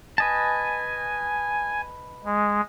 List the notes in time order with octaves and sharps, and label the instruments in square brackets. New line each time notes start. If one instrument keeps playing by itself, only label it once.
[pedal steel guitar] B4 D#5 A5 [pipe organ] G#5
[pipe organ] G#3